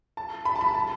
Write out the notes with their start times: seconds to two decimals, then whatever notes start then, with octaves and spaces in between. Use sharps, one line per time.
0.17 A5
0.45 B5
0.56 A5
0.61 B5
0.74 A5